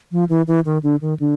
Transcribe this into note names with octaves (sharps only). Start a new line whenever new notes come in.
F3
E3
E3
D#3
D3
D#3
D3